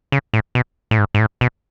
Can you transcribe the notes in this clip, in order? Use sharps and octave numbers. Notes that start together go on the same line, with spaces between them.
C#3
A2
B2
A2
G#2
G#2
A2
B2